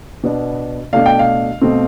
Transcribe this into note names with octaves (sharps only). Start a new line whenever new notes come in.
B2 B3 D4
B2 A3 D4 F5
G5
F5
B2 A3 C4